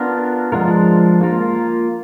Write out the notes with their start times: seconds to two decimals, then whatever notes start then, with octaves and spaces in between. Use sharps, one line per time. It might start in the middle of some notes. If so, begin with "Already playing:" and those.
Already playing: B3 D4 F4 A#4
0.52 F3 G#3 D4 F4 A#4
1.21 A#3 F4 A#4